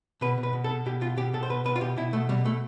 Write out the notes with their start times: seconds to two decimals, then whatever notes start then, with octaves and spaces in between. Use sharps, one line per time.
0.21 B2 B4
0.38 B2
0.43 B4
0.53 B2
0.64 A4
0.69 B2
0.86 B2 G4
1.01 B2 F4
1.17 B2 G4
1.33 B2 A4
1.43 C5
1.49 B2 B4
1.65 B2 B4
1.76 F4
1.81 B2 G4
1.97 B2 E4
2.13 B2 A3
2.29 B2 G3
2.45 B2 A3